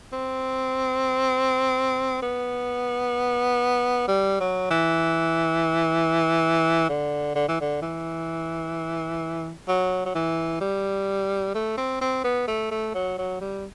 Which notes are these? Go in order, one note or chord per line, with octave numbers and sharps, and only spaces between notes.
C4
B3
G3
F#3
E3
D3
D3
E3
D3
E3
F#3
F#3
E3
G3
A3
C4
C4
B3
A3
A3
F#3
F#3
G3